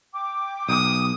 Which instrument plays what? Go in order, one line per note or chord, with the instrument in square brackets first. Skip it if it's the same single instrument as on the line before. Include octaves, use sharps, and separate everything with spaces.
[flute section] G5 D6
[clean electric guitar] B1 [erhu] D#6